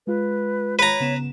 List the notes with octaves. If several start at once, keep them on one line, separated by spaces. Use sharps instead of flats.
G#3 F4 B4
B4 C#5 A#5
C#3 B3 E7